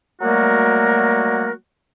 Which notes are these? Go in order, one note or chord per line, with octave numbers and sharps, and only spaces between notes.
F#3 G3 A3 A#3 F#4 A#4